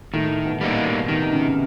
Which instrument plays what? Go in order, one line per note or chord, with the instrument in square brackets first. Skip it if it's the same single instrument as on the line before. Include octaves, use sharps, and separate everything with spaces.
[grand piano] A2 [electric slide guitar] D#3
[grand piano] B2
[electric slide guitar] G3 A#3 D#4
[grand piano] B2
[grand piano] C3 [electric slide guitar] D#3
[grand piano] C#3